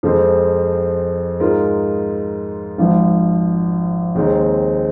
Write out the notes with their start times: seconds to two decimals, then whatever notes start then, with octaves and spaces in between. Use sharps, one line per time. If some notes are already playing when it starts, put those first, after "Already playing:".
0.03 F2 F3 G#3 C4
1.40 G#2 G#3 F4 A#4
2.78 G#1 G#2 F3
4.15 D#2 D#3 G#3 C4